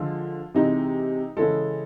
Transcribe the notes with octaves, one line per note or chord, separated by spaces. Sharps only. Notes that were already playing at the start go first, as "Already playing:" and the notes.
Already playing: D3 F3 G#3 F4
C3 E3 G#3 D#4
C#3 E3 G#3 A4